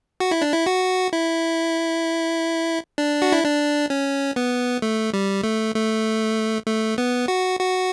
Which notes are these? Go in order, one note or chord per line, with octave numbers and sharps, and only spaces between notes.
F#4
E4
D4
E4
F#4
E4
D4
F#4
E4
D4
C#4
B3
A3
G3
A3
A3
A3
B3
F#4
F#4